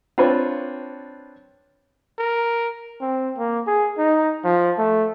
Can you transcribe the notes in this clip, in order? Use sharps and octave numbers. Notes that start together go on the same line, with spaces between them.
C4 D4 F4 B4 C#5
A#4
C4
A#3
G#4
D#4
F3
A3